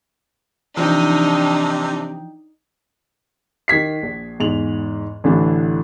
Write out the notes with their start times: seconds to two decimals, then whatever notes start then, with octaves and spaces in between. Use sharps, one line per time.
0.77 C3 E3 F3 D4 D#4 G5
3.68 D#3 G#6 B6 C7
4.03 A#1
4.39 E2 G#2 F7 F#7
5.24 A1 D3 E3 D4